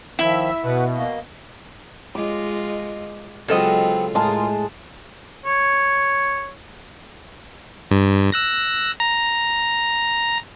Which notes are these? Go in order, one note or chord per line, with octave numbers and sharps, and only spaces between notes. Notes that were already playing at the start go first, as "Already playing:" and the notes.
D#3 F3 E4 E5
B2 B4 F#5
A#3 D#5
G#3 F4 D#5 D6
C#3 F#3 G#3 B3 C4 F4 A4 D#5
A2 G#3 F4 G#4 A#4 A5
C#5
G2
E6 F#6 A#6
A#5